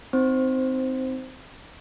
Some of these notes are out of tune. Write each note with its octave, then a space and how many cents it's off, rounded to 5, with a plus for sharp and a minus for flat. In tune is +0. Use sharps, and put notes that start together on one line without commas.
C4 -15 D#4 +0 C5 +0